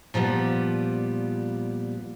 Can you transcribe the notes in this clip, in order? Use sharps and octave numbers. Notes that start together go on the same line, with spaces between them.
A#2 F3 G3 B3